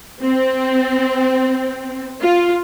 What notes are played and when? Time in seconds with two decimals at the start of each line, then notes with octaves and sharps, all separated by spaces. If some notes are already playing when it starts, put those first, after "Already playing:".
0.22 C4
2.22 F4